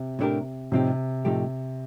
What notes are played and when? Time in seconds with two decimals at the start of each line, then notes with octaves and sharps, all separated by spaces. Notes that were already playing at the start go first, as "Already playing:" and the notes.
Already playing: C3
0.19 A2 A3 D4 G4 A#4
0.72 A2 C3 F3 C4 D#4 G4
1.25 A2 F3 A3 D#4 G4